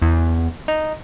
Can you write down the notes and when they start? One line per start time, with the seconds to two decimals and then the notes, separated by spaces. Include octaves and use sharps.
0.02 E2
0.68 D#4